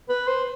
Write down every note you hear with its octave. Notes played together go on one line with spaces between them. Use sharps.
B4
C5